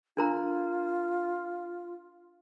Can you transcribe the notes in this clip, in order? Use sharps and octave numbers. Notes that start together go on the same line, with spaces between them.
D4 F4 A#4 A#5